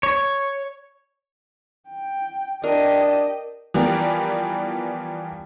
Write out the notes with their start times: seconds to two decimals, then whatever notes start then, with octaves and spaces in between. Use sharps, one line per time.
0.03 C#5
1.89 G5
2.64 D4 G4 A#4 D#5
3.74 E3 F3 G3 B3 G4 A#4